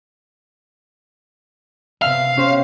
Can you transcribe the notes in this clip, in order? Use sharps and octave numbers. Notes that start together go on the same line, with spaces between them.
C3 B3 E5 F5
C#4 G4 C5